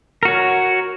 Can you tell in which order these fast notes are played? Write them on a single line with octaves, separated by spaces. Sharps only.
A#4 F#4 C#5